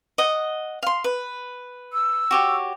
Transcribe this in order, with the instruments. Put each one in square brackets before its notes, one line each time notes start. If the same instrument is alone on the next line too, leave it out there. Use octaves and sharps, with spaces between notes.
[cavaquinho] D#5 F#5
F5 C6
B4
[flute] E6
[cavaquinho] F#4 G4 C#5